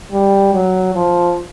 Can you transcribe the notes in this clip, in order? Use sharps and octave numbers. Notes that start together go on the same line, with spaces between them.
G3
F#3
F3